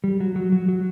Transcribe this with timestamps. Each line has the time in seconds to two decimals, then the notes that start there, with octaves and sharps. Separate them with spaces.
0.04 G3
0.20 F#3
0.36 F#3
0.52 F#3
0.68 F#3